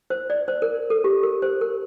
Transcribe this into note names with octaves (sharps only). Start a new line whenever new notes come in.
C5
D5
C5
A#4
A4
G4
A#4
C5
A#4